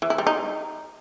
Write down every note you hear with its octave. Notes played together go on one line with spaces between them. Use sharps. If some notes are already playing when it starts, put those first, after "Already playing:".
E3
E4
G3
D#4